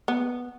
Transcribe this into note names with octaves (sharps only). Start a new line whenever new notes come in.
B3